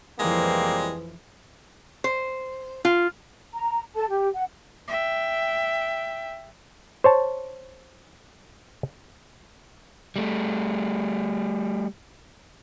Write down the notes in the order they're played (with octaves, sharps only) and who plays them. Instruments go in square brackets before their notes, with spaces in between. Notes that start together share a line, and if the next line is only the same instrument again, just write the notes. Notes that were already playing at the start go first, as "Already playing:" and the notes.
[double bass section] F1 E3 F3 [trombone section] G3 A#3 C4 [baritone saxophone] G#3
[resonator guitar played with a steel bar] C5
F4
[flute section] A#5
A4 A5
G4
F#5
[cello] E5 G5
[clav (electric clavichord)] C5 C#5 A5
[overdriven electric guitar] G3 A3